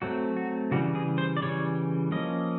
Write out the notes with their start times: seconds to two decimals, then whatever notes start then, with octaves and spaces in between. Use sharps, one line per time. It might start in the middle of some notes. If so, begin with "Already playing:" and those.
0.02 F#3 A3 C4 F#4
0.37 F#4
0.71 C#3 E3 G3 F#4
0.95 G#4
1.18 C5
1.37 D5
1.42 C#3 E3 G3 C#5
2.11 F3 A#3 C#4 D#5